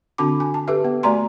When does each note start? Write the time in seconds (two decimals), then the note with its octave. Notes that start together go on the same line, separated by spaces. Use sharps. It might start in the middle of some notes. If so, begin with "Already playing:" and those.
0.18 D3 C4 D4 F#4 B5 D6
0.40 G#5
0.54 A5
0.68 G4 A4 B4 E5
0.84 B3
1.03 A3 F#4 D5 G#5 A#5 C6